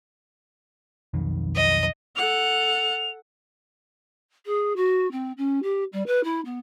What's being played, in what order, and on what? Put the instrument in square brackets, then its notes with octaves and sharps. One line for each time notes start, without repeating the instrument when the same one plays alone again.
[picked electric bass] B1 F2 D#3
[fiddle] D#5
[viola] A4 F#5 [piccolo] F7
[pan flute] G#4
F#4
C4
C#4
G4
G3
B4
E4
B3